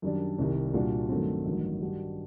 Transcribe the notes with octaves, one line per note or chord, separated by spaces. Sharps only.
F#2 D#3 G3 D4
C2 C3 D#3 G3
C2 A#2 G3 D4 F#4
G2 D#3 F#3 A3 C4
A1 G2 D#3 F#3
G2 D#3 G3 D4 F#4